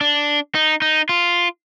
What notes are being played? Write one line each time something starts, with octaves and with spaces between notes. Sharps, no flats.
D4
D#4
D#4
F4